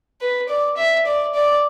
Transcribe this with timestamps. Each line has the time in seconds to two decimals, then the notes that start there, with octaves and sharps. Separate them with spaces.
0.21 B4
0.49 D5
0.77 E5
1.06 D5
1.34 D5